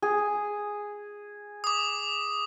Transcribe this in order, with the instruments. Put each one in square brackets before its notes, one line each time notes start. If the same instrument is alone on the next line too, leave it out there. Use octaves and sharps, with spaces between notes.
[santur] G#4
[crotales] D6 D#6